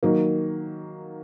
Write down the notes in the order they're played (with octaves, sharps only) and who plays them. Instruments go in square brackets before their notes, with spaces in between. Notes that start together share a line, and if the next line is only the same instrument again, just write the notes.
[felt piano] D#3 F#3 A#3